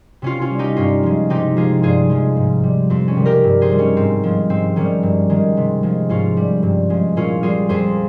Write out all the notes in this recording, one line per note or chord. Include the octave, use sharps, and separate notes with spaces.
C3 C#4 F4
C#4 F4
G3
D#4 G4
G2 C#4 F4
F3 G#3
C3 D#4 G4
F3 G#3 F4 G#4
G2 F4 G#4
F3 G#3
G#2
G3
F2 C4
C#4
C3 D#3 G3
G4 A#4
G2
G#4 C5
D#3 G3
C#4
G#2 C4
F3 G#3
G#2 C4
D#3 G3 C#4
G2
D#3 G#3
C3
F3 G#3
G#2 C#4 F4
G3
G2
F3 G#3
A#2 C#4 F4
G3 F4 G#4
F2 G#4 C5